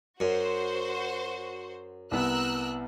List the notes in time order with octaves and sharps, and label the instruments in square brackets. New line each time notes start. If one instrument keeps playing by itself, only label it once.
[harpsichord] F#2 [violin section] F#4 C5
[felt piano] C2 B3 [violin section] A#4 E6 F#6